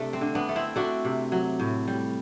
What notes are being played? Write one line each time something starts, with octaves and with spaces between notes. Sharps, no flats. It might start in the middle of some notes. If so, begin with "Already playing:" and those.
Already playing: C3 A3 D4
C4
D3
B3 D4
A3
C4 E4
A3 D4 F#4
C3
F#3
A2
G3